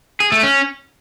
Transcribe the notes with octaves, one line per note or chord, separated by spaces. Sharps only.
G#4
A3
C#4